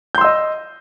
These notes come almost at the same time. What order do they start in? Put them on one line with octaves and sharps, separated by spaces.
G6 C6 E6 D#5